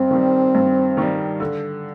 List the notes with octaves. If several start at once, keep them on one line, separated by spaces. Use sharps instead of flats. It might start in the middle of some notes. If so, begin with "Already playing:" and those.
Already playing: G2 C4
D#3 G3
G2
D#3 G3
D3